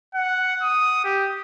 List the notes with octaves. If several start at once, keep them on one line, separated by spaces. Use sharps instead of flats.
F#5
D#6
G4